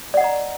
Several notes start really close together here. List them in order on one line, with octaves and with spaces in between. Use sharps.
D5 F#5 D#5 A#5